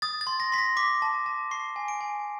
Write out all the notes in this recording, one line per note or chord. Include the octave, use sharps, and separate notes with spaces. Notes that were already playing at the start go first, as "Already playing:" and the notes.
D#6 A6
A6
C6
A#6
C6 B6
A#6
D6 B6
A5
A5
C#6 C7
G#5
D7
G#5